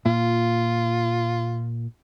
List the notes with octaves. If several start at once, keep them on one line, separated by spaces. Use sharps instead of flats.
A#2 F4